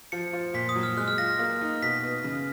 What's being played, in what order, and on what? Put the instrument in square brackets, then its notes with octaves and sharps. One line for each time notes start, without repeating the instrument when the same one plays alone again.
[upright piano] F3 [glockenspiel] C#7
[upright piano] F3
[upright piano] A#2 [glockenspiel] B6
[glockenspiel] D#6
[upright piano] F#3
[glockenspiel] F6
[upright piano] G#3 [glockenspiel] F#6
[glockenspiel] F6
[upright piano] F4 [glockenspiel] A#6
[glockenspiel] A#6
[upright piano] A#3
D#4
[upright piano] B2 [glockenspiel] B6
[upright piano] B3
C#3